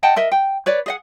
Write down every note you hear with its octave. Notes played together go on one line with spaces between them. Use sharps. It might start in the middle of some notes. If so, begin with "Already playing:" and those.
D#5 F#5 G5 A5
A#4 D#5 E5
G5
B4 C#5 D5
G#4 D#5 F#5